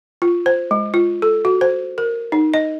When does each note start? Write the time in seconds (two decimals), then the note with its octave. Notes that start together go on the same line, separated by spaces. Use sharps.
0.22 F4
0.46 C5
0.71 G#3
0.94 F4
1.22 A4
1.45 F#4
1.61 C5
1.98 A#4
2.32 D#4
2.54 D#5